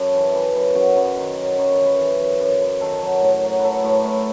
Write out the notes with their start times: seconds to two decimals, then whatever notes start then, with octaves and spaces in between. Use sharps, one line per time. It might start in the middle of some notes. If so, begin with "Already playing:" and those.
Already playing: F#2 A4
0.14 E3
0.35 E3
0.56 F#2
0.75 F#2 F#4
0.96 F#2 D#5
1.17 D#3
1.38 F#3
1.57 F#2 C#5
1.72 B4
1.78 E3
1.85 B4
1.99 E3
2.20 F#2
2.40 F#2
2.61 F#2
2.81 D#3 A4
3.02 F#3
3.22 A2
3.43 F#3
3.59 F#3 A4 B4
3.83 A2
4.04 A2